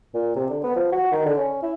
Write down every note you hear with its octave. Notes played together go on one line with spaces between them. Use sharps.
A#2
C3
D3
B3
F3
F#4
D#3
D3
C#4
E4